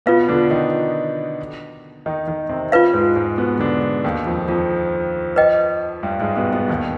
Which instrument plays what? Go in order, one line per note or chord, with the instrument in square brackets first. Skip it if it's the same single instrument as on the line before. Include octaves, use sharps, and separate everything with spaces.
[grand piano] B2 B3 [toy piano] F4 B4 F5
[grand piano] D3 D4
D#3 D#4
D#3 D#4
D#3 D#4
C3 C4
[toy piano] F4 B4 F5
[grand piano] G#2 G#3
G#2 G#3
B2 B3
D3 D4
D#2 D#3
F2 F3
F2 F3
[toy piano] B4 D#5 G5
[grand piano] G2 G3
G#2 G#3
B2 B3
B2 B3
D#2 D#3